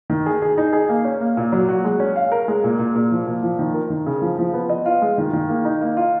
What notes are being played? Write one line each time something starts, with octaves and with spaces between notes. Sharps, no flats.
D#3
G#4
G#4
D#4
G#4
A#3
C#4
A#3
A#2
F#3
F#4
G#3
C#4
F5
A#4
G#3
A#2
A#2
A#2
F3
A#2
F3
D#3
A#4
D#3
C#3
F3
F3
B3
D#5
F4
G#3
D#3
D#3
A#3
D#4
A#3
F4